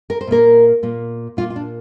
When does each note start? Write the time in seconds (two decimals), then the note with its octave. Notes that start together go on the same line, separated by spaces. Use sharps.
0.10 A#4
0.21 C5
0.27 A#2 A#3 A#4
0.83 A#2 A#3
1.37 A#2 F4
1.41 A#3
1.50 F4
1.56 D4